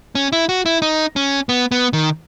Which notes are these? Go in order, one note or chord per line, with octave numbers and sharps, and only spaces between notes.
C#4
E4
F#4
E4
D#4
C#4
B3
B3
D#3